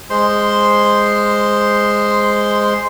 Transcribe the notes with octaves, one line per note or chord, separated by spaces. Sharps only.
G#3 C5 C6